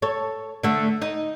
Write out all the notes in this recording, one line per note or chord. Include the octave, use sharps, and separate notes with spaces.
A4 C#5
D3 A3
D#4